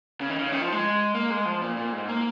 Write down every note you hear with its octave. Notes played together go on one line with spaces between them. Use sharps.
C#3
D#3
C#3
D#3
F3
G#3
A#3
G#3
F3
A#2
A#2
G#2
A#3